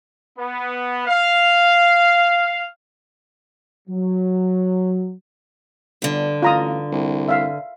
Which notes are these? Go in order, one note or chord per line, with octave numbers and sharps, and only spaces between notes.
B3
F5
F#3
G1 G2 D3
A1 F4 A#5 D#6
C2
E5 F5